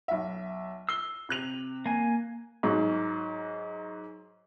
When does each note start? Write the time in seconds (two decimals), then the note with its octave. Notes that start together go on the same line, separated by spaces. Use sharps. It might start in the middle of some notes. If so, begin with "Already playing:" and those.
0.08 B1 E5
0.89 E6 C7 G7
1.29 C3 F#6 F7
1.86 A#3 G#5
2.63 G#2 F#3